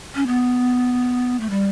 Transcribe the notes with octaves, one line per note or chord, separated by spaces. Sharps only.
C#4
B3
A3
G3